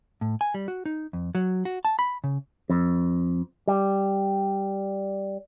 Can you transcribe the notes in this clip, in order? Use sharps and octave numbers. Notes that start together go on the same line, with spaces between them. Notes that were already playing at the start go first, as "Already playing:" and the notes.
A2
G#5
G3
F#4
D#4
F2
F#3
F#4
A5
B5
C#3
F2
G3